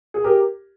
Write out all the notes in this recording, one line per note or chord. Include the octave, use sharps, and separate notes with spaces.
G#4
G4 A#4